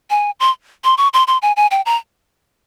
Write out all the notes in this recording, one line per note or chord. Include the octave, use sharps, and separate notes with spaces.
G#5
C6
C6
C#6
C6
C6
G#5
G#5
G5
A#5